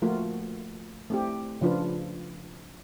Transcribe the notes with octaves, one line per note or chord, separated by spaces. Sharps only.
F3 A3 A#3 F4 F#4
A3 C4 G4
C#3 F3 D4 F4 B4